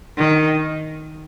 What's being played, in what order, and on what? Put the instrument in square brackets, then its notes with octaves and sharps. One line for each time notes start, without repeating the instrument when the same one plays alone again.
[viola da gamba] D#3